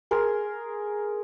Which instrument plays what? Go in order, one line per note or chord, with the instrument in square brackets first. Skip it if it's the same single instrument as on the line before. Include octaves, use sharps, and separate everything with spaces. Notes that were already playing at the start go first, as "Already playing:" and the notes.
[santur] G#4 A#4 C6